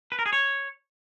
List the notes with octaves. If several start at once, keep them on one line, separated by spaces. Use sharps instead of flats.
B4
A#4
G#4
C#5